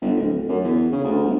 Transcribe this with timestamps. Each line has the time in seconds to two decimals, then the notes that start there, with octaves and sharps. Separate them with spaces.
0.02 G1
0.17 D1
0.34 D1
0.49 F#2
0.64 E2
0.92 C#3
1.04 D2
1.24 G1